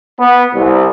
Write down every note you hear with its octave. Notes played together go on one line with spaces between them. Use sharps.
B3
C2